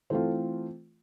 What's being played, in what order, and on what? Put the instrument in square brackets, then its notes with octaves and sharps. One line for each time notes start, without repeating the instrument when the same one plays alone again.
[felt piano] E3 A3 C4 F4 A4 C5